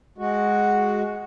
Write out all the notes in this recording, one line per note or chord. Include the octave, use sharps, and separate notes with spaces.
G#3 F#4